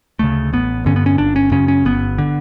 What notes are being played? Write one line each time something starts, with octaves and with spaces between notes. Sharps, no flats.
D2 C#3 A3
A1 B3
G2 D3 C#4
B3
C#4
G1 D4
C#4
F#2 C#3 C#4
C#4
G1 B3
D3